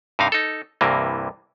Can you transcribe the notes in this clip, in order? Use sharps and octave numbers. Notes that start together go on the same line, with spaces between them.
G2 C3 D#4 F5
D#4 A4
C2 G2 C3 E3 A#3